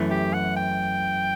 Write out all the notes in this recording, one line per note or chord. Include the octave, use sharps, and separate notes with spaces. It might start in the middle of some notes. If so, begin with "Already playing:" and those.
Already playing: F#2 E3 A3
G4
F#5
G5